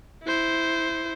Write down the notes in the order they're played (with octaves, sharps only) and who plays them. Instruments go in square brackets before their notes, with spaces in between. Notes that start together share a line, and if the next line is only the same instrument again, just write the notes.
[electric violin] E4 C5